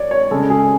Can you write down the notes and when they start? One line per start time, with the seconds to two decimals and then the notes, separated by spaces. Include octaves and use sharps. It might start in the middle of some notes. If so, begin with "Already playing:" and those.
Already playing: C#5 D5
0.11 C#5
0.31 C#3 G#3 A4
0.50 G#4